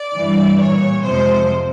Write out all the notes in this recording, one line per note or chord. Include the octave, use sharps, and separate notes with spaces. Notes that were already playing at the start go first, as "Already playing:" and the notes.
Already playing: D5
G2 E3 G3
A#2 G3 C#5
F2 C3 F3 G#3 C5